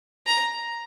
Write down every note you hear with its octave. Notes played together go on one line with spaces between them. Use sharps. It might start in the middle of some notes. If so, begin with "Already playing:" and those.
A#5